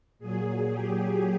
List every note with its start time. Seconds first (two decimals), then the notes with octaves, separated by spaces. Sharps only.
0.19 A#2 F#3 G#4
0.70 G4